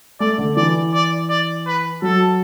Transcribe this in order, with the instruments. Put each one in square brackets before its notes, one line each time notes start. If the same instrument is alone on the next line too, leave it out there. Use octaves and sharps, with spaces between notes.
[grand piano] A3 [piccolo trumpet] D5
[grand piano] D3
[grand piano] E3 [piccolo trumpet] D5
[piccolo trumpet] D5
D5
B4
[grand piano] F#3 [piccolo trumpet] A4